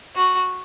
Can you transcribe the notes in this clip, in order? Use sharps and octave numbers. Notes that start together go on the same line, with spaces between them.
F#4